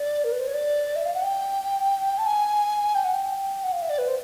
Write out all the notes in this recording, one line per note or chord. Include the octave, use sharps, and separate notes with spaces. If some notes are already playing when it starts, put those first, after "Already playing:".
Already playing: D5
A#4
B4
C5
C#5
D5
E5
F5
F#5
G5
A5
G#5
G5
F#5
G5
F#5
F5
E5
D5
B4
C5